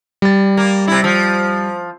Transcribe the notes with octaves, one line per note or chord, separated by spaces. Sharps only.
G3 A6
A#3
C3 E4
F3